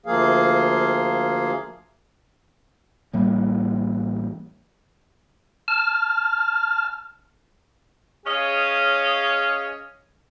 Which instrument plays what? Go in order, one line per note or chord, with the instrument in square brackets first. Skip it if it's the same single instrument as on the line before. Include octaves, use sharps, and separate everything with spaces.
[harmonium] D2 F3 A#3 G#4 F5
[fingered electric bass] A1 A2 G3 A#3
[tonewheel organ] A5 F6
[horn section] C#4 G#4 C#5 D#5 F5